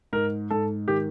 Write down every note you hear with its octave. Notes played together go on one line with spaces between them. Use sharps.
G#2 A#4
G#2 A4
D#3 G4